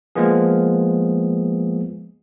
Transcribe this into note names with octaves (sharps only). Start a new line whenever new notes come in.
F3 G#3 A#3 B3 G#4